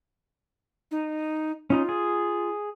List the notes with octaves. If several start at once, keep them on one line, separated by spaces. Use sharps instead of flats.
D#4
C#4 D#4 F4 A#5
G#4